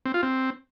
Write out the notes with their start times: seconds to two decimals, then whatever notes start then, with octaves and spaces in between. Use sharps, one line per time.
0.06 C4
0.14 F4
0.23 C4